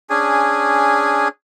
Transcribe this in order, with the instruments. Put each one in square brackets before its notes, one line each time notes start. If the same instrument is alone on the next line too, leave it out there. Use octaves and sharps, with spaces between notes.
[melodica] C#4 D4 G#4 G#5